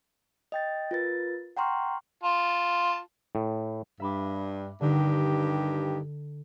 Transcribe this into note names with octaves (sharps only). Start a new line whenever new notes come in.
D#5 G5 A6
F4 A#4 B4 A6
F#5 G5 A#5 C6 C#6 F6
F4 A5
A2
G2 E5 B5 D6
G2 D3 D#3 G4 F#6